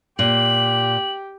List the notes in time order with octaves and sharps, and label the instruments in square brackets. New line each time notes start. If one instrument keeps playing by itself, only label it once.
[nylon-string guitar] A#2 [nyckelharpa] G4 [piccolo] F#7